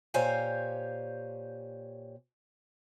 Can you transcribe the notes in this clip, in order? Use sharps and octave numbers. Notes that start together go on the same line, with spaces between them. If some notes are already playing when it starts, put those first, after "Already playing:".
A#2 G4 C5 C#5 F5 G#5